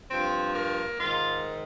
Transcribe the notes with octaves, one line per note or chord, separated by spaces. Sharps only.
G2 F3 C4
A#3
G#2 D#3 F4